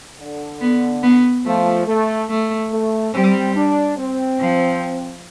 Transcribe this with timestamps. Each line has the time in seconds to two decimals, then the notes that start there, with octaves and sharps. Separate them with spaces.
0.19 D3
0.61 B3
1.03 B3
1.45 F3 A3
1.87 A3
2.29 A3
2.72 A3
3.14 G3 C4
3.56 D4
3.98 C4
4.40 F3